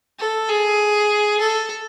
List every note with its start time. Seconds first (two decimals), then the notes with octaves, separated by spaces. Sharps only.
0.20 A4
0.49 G#4
1.40 A4